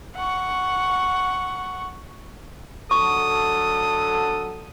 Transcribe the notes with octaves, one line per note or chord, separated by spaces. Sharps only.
F#5 C#6
D3 F#3 A4 C#6 D#6